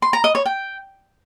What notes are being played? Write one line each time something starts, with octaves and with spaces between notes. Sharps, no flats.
C6
A#5
D#5
C#5
G5